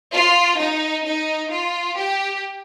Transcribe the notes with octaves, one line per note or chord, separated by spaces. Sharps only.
F4
D#4
D#4
F4
G4